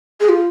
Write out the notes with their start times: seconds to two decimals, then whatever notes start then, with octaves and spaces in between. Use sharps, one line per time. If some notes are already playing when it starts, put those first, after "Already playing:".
0.20 G#4
0.29 F4